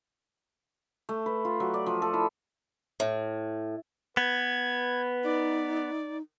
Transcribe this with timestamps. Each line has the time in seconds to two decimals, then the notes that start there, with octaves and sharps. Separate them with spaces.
1.09 A3
1.26 B4
1.45 F4
1.60 F#3
1.74 D5
1.86 F3
2.02 A4
2.14 E4
3.00 A2
4.17 B3 B4 G#6
5.24 D#4 D5